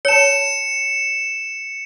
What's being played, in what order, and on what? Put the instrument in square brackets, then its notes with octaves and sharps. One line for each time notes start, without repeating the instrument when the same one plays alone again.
[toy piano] C#5 A5 [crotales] C#7 E7